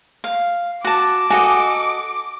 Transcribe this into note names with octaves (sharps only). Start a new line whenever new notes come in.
F5
F#4 A5 D6
F#4 A4 D#5 F#5 G#5